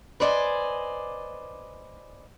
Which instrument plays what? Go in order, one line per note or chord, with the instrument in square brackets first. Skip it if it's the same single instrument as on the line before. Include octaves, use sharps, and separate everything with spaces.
[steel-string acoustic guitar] B4 C5 D5 D#5 G5 G#5